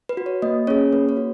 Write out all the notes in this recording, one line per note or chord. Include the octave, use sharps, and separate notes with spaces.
B4
F#4
C#5
A#3 D#5
C#4 G#4 C#5
A#3 B4
C#5
F#4